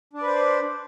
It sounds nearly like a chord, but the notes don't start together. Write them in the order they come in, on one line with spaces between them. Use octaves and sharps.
D4 D5 B4 C5